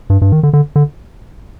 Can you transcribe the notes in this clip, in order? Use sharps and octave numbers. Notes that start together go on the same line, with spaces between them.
G2
G2
D#3
D3
D3
D3